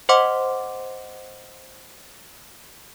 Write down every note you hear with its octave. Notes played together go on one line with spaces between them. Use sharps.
C5 D#5 F#5 C6 D6